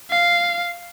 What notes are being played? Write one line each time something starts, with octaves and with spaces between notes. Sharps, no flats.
F5